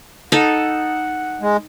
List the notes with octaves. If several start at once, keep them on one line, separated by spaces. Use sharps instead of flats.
D#4 A4 F#5
G#3